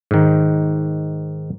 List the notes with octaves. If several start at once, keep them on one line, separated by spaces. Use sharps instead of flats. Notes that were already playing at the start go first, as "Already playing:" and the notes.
G#2 D#3